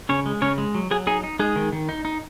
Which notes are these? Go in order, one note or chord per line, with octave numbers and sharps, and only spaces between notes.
C#3 C#4 C#5
G#3
C#3 C#4 C#5
G#3
F#3
F#3 G#4 G#5
D#4 G#4 G#5
D#4
G#3 D#4 G#4
D#3
D#3
D#4
D#4